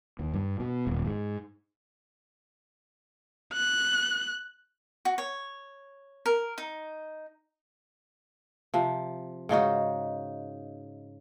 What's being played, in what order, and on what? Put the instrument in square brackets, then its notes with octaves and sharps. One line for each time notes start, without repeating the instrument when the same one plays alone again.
[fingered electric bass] D#2
G2
B2
D#1
G#2
[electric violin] F#6
[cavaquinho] F#4
C#5
A#4
D#4
[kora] C3 F3
G#2 C#3 D#4 F#4